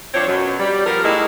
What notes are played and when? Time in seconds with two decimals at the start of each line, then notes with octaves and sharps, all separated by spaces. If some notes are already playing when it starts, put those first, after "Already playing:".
0.14 F3 C4 D4 F4 C#5
0.28 F#2 B2 F#3
0.59 G3
0.86 F3 G3 B3 A#4
1.04 A2 G#3 A#3 D#4 E4 G#4